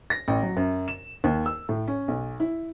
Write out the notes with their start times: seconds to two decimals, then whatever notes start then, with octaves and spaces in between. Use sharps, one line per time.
0.10 A#6
0.28 A1
0.43 F#3
0.57 F#2
0.88 E7
1.24 D#2
1.46 E6
1.69 A2
1.88 C#4
2.08 B1
2.40 E4